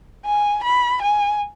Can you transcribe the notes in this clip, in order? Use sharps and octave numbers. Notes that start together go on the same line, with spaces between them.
G#5
B5
G#5